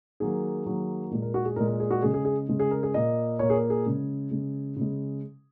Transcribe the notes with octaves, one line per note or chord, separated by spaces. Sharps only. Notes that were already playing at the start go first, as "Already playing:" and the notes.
D#3 F#3 A#3 G#4
D#3 F#3 A#3
A#2 G#3
A#4
F#4
G#4
A#2 G#3 A#4
A#4
G#4
F#4
C#3 G#3 G#4
G#4
G#4
C#3 G#3
G#4
A#4
G#4
A#2 A#3 D#5
A#2 A#3 C#5
G#4
A#4
G#4
C#3 G#3
C#3 G#3
C#3 G#3